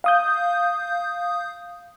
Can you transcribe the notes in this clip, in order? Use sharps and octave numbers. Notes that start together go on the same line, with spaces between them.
F5 D#6 G6